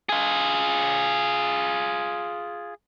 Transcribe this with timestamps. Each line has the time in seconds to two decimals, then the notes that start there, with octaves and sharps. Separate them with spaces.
0.09 F4 G#4